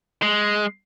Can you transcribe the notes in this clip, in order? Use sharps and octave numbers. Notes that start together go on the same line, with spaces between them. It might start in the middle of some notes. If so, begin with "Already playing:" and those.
G#3